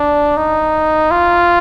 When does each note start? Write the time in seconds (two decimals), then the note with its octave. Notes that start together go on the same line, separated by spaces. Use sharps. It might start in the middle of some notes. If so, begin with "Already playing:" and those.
Already playing: D4
0.37 D#4
1.11 F4